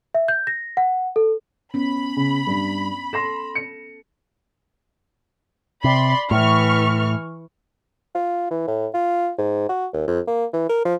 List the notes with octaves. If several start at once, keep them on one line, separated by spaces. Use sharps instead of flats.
E5
G6
A#6
F#5
A4
B3 C#4 B5
C#3
G2
A4 C6 A#6 E7
C#7
C3 D5 B5 C6
A2 E3 C#6 F6
F4
E3
A2
F4
G#2
F#4
D#2
F2
A#3
E3
A#4
F3